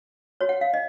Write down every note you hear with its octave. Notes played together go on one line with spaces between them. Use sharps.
F#4 C#5
F#5
F5
D#5